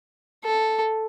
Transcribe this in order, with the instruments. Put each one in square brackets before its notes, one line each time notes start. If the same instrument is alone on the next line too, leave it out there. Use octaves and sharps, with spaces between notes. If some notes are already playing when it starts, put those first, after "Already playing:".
[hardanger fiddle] A4